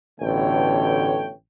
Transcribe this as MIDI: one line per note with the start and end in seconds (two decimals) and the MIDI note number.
0.21 1.33 33
0.21 1.33 47
0.21 1.33 50
0.21 1.33 57
0.21 1.33 73
0.21 1.33 79